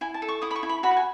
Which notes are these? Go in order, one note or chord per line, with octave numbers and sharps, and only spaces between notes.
E4 G#5
A5
A4
C#6
E4 D#6
B5
C#6
E4
B5
F#4 B5
F#5
G#5